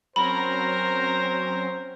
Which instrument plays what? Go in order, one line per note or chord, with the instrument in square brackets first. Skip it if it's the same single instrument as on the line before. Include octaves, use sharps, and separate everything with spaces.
[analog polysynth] F#3 C4 C#4 [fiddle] A#4 A#5 [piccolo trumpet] C5 [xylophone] B5